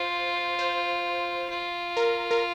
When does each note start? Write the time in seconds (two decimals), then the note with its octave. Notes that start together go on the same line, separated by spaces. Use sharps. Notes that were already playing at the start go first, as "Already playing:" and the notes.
Already playing: F4 C5
0.59 C5
1.50 F4
1.97 A#4
2.31 A#4